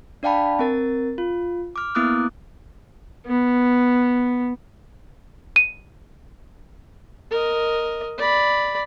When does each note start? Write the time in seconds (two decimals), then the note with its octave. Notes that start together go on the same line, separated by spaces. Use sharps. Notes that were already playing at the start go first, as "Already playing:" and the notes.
0.23 D4 D5 F5 G5 A5 B5
0.59 C4 A#4 A6
1.18 F4
1.76 D6 F6
1.95 A#3 B3 E4 D6 D#6 F#6
3.26 B3
5.56 D#7
7.31 A#4 D#5
8.18 D5 B5